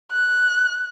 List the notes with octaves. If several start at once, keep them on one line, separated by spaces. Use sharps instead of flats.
F#6